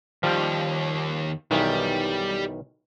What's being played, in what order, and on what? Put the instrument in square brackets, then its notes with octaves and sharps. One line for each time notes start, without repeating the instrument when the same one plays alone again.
[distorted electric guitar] D#2 G4 [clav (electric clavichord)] F3 G3
[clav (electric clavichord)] B1 D#3 E3 [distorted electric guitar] G3